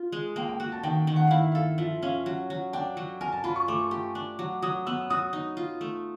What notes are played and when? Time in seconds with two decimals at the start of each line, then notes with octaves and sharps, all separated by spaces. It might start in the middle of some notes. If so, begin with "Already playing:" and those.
Already playing: F4
0.12 G#3
0.36 A#3 G5
0.48 G5
0.60 F#4
0.72 A5
0.83 D#3 G5
1.07 D#3
1.16 F#5
1.27 E4 F5
1.39 E5
1.52 A4 F5
1.78 F3 E5
2.02 C#4 F5
2.26 F#3
2.50 F#3
2.73 D4 G5
2.97 F#3
3.21 A#4 G#5
3.32 A5
3.44 F4 B5
3.56 C#6
3.68 A3 D6
3.91 G4
4.15 D4
4.39 F#3
4.62 F#3 D#6
4.86 B3 E6
5.10 F#4 D#6
5.33 D#4
5.57 F4
5.81 A3